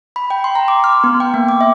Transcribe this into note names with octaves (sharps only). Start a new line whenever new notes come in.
B5
G5
C6
A#5
D6
F6
B3
G5
A#3
D6
E5